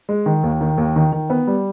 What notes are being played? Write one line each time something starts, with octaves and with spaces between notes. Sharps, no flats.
G#3
D#3
D#2
D#3
D#2
D#3
D#3
B3
G3